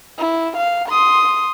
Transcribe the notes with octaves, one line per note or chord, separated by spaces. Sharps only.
E4
F5
C6 D#6